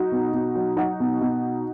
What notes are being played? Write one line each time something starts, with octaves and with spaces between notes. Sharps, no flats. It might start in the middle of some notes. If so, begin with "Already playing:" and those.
Already playing: F#3 D#4 F#4
B2
B2
F#3
F#3 D#4 F#4
B2
B2